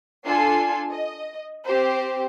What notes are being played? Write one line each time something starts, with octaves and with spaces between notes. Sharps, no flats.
D4 F4 A4 G#5 C7
D#5
C4 G4 C5